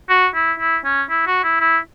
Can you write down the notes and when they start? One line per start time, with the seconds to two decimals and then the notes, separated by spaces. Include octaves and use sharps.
0.10 F#4
0.35 E4
0.60 E4
0.85 C#4
1.10 E4
1.27 F#4
1.44 E4
1.61 E4